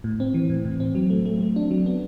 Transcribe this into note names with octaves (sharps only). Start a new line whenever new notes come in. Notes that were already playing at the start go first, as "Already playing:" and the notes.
A2
C4
E3
A2
A2
C4
F#3
A3
A3
A3
D4
F#3
B3